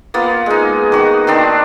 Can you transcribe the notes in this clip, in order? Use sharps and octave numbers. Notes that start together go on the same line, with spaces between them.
A#3 B3 F4
G#3 D#4
D#3 F#4
D#3 C4 D4 D#4